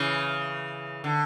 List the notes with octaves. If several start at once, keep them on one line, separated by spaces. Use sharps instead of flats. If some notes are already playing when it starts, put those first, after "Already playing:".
Already playing: C#3 E3
D3